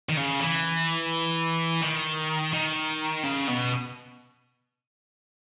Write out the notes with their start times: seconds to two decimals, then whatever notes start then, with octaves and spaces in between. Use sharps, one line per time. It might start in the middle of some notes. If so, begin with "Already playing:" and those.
0.09 D#3
0.17 C#3
0.40 E3
1.82 D#3
2.53 D#3
3.24 C#3
3.47 B2